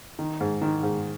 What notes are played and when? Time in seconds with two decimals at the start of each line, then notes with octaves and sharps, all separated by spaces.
0.19 D#3
0.41 G#2
0.62 D#3
0.83 G#2